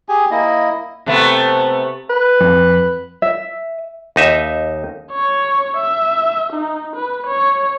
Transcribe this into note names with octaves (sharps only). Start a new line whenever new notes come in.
G4 G#4 G#5
A#3 E4 D#5
C3 A3 B3
B4
F2
E5
D#2 D#4 E5
C#5
E5
D#4
B4
C#5